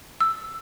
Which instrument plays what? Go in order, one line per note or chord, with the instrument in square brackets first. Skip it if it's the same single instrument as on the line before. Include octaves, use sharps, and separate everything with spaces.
[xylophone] E6